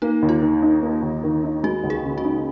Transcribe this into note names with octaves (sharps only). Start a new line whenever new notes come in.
A#3 D#4
D#2
F4
D#3
D#4
A#3
D#2
D#3
D#4
G#3 F#4
C#2
G#4
C#3
F#4
D#4